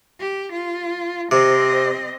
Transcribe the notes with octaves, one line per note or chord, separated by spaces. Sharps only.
G4
F4
C3 C4 D#5